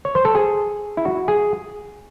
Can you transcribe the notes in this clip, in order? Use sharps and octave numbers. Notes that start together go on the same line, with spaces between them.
C#5
C5
A4
G#4
E4
F#4
G#4